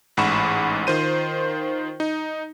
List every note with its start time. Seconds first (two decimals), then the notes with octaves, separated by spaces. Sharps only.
0.17 A1 G#2 F#5 B5 C#6 E7
0.87 D#3 F4 C5 D#7
2.00 D#4